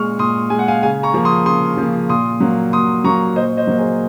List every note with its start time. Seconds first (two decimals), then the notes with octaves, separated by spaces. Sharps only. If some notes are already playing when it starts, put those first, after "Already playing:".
Already playing: A#2 G#3 C#6 F6
0.19 A#2 C6 D#6
0.50 G#3 G#5
0.59 F#5
0.68 F5 G#5
0.83 C#3 F5 G#5
1.03 A#5 C#6
1.14 F3 A#3
1.25 C6 D#6
1.46 C#3 C6 D#6
1.77 F3 A#3
2.09 A#2 C6 D#6
2.40 F#3 A#3
2.73 A#2 C6 D#6
3.04 F#3 A#3 A#5 C#6
3.36 A#2 C5 D#5
3.57 C5 D#5
3.67 F#3 A#3
3.78 G#4 C5